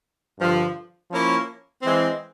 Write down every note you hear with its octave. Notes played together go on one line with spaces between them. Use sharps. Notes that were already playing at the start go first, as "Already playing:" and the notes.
G2 D3 F3
F3 A#3 C#4 E4
E3 G#3 C4